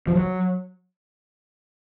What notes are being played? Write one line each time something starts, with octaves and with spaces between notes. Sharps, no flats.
F3
F#3